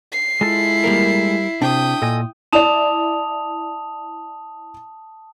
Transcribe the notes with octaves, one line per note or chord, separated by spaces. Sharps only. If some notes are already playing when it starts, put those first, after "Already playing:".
C7
G#3 E4 F4 A4
G3 A#3 A#4
C3 D4 G5 D#6
A#2 A4 D#5 G#5
E4 D5 A5 D#6 F7